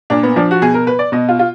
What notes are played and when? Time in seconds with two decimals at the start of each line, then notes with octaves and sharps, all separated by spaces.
0.10 A#2 D4
0.23 B3
0.36 F3 D4
0.51 F#4
0.62 B2 G#4
0.74 A#4
0.87 B4
0.99 D5
1.12 B2 D#5
1.28 F4
1.39 F4